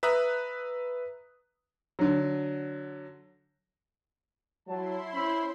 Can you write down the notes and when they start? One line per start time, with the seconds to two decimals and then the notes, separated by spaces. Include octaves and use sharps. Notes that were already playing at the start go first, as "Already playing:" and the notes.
0.03 B4 E5 A#5 D#6 F#6
1.99 D3 F#3
4.68 F#3 E4 A5 C6
5.14 C#4 C5 E5 B5